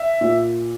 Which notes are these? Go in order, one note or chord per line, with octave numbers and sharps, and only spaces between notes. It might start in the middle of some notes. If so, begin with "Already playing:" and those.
Already playing: E5
A#2